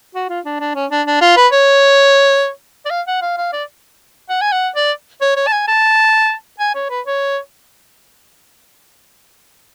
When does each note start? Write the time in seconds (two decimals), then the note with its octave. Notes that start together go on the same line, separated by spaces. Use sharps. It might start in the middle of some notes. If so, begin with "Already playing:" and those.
0.15 F#4
0.29 F4
0.46 D4
0.60 D4
0.75 C#4
0.91 D4
1.07 D4
1.21 F4
1.37 B4
1.52 C#5
2.86 D5
2.91 F5
3.07 F#5
3.22 F5
3.37 F5
3.53 D5
4.29 F#5
4.41 G#5
4.52 F#5
4.76 D5
5.21 C#5
5.37 C#5
5.47 A5
5.53 G#5
5.68 A5
6.60 G#5
6.75 C#5
6.90 B4
7.06 C#5